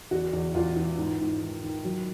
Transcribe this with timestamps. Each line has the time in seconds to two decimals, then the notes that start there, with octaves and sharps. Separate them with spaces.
0.11 E2 F#4
0.33 E2
0.55 E2 F4
0.76 E3
0.98 G#2
1.20 G#2
1.42 D#3
1.63 D#3
1.85 F#3